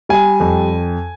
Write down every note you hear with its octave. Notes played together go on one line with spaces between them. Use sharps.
G3 G#5
F2